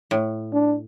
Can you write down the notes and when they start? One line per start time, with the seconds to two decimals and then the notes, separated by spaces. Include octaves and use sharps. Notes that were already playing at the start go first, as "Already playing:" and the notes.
0.11 A2
0.53 D4